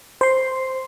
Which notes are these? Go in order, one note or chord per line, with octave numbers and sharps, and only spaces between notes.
C5 C6